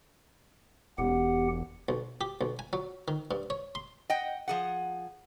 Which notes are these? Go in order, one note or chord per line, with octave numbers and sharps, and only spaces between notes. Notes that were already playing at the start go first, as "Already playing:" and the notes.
E1 B3 G4 F#5
B1
G4
B1
G#5
F#3
D#3
G2
C#5
C6
D#5 F#5 G5
F3 G#4 F#5